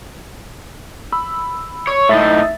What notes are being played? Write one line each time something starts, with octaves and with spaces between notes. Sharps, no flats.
B5 E6
C#5
A2 D#4 E5 A6